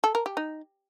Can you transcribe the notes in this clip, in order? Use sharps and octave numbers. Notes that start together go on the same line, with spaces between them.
A4
A#4
G4
D#4